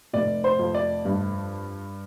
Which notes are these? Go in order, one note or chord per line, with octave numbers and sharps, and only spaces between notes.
F1 D5
C5
F2
D5
G2